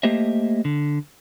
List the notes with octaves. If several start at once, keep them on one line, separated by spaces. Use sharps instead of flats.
A3 A#3 G4 C5 D#5 E5
D3